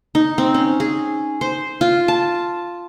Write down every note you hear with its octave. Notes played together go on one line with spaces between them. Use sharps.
D#4
C4
C#4
G#4
C5
F4
A5